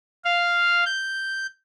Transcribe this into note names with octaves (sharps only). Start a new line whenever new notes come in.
F5
G6